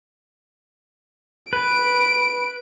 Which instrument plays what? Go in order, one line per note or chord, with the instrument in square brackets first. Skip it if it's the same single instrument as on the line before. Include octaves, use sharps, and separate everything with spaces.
[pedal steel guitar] B4 [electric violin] D7